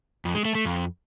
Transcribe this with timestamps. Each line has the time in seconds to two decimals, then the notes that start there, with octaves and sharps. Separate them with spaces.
0.25 F2
0.35 G#3
0.45 A3
0.55 A3
0.65 F2